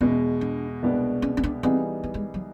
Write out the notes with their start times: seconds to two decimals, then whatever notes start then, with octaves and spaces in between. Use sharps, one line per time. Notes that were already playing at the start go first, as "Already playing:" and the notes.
0.01 E2 B2 G#3 C#4
0.41 D4
0.82 C2 B2 G#3 B3 D4
1.22 C#4
1.37 C#4
1.43 D4
1.63 E3 G3 B3 C4 D#4 G#4
2.04 B3
2.14 G#3
2.34 F#3